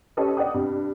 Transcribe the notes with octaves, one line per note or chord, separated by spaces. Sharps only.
C#4 G4 A4 B4 D#5
D5 D#5 F#5 G5 D#6
G2 C3